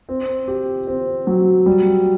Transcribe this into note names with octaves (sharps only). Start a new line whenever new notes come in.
C4
G4
C4
F#3
G3